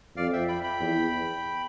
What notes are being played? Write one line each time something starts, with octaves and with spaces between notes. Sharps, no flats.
F2 D5 F5
E5 G5
G5 B5
G5 B5
E2